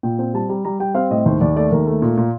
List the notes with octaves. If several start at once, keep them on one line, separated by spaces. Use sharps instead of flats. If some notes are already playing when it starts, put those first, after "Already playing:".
A#2 G5
C4 G5
G3 A5
G3 A#5
G3 A#5
G3 G5
C4 F5
A2 D#5
D#2 C5
D#2 D5
A3 D5
D#2 A#4
A3
A#2
A#2